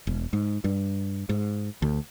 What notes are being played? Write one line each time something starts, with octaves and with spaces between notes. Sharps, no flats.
E1
G#2
G2
G#2
D2